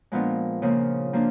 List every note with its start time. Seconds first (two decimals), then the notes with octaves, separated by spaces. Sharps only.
0.12 A#2 F3 G#3 B3 D4
0.62 C#3 F3 A#3
1.13 F3 A#3 D4